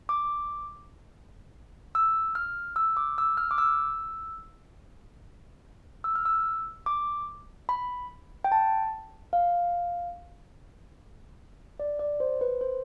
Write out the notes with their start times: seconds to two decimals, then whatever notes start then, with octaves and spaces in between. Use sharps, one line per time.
0.09 D6
1.95 E6
2.35 F6
2.76 E6
2.97 D6
3.18 E6
3.37 F6
3.51 D6
3.58 E6
6.04 E6
6.15 F6
6.25 E6
6.86 D6
7.69 B5
8.44 G5
8.52 A5
9.33 F5
11.80 D5
11.99 D5
12.20 C5
12.41 B4
12.61 C5